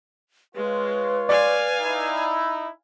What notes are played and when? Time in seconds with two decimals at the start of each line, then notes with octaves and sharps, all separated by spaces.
0.55 G#3 F4 B4 C#5
1.29 D5 F5 G#5
1.81 D#4 E4